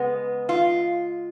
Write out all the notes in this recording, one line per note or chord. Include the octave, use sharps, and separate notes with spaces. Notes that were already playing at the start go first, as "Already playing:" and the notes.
Already playing: C#3 G#3 B3
F4